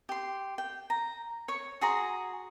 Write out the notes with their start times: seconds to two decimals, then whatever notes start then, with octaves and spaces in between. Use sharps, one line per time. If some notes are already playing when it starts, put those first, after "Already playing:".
0.09 G4 C6
0.58 G5
0.90 A#5
1.48 C#5 C#6
1.81 F#4 G#4 A#5 C6